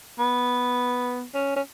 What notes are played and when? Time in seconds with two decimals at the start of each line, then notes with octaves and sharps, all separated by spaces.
0.19 B3
1.34 C#4
1.56 C#4